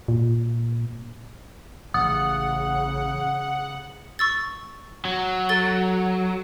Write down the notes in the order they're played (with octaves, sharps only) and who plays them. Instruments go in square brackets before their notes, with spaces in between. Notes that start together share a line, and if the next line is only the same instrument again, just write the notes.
[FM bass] A#2
[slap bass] A1 [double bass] C#3 [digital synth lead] F#5 [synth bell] D#6
[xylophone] C#6 E6 A6
[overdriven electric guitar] F#3
[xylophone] A4 A6 G7